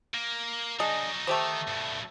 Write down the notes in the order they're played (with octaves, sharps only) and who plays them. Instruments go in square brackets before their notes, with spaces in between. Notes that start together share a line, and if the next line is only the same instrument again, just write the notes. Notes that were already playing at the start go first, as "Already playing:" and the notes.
[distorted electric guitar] A#3
[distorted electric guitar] F#3 D#4 [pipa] D4 G#4 D#5
[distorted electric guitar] D#3 [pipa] A3 G4 C5
[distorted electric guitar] G2 B2